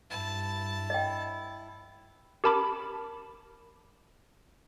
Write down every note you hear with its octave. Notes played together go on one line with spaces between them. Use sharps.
G2 E4 A5
D#5 G5
G4 A#4 A5 B5 D6